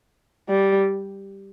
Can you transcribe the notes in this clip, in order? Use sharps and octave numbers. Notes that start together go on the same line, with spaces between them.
G3